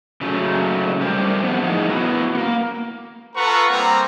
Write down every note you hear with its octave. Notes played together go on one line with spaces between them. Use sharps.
C#3 F#3 A3
G3 A3 C4 G4 A#4 C5
F3 A3 B3
A2 F3 D#4 G#4
B3 E4 F#4 A#4
A#3 B3
F4 A4 B4 F#5 A#5 C#6
G3 A#3 C4 A#5